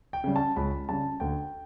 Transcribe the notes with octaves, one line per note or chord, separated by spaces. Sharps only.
G5
C#3 G3
A5
C#2 B5
C#3 G3 A5
D2 G5